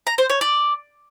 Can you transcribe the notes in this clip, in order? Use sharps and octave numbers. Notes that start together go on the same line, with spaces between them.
A#5
C5
C#5
D5